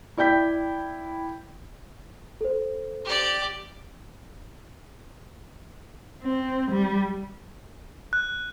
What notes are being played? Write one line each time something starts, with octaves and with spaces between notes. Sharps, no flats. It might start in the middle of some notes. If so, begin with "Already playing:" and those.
E4 D5 G5 G6 B6
A4 C5
G4 D5
C4
G3
F#6